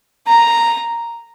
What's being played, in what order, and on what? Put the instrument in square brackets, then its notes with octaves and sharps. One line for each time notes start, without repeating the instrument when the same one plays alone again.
[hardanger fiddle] A#5